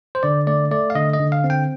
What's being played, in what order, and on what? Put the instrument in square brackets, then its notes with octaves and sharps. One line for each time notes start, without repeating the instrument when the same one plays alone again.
[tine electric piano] C5
D3 D5
A3 D5
A3 D5
F5
D3 D#5
D#5
D3
F5
C4
G5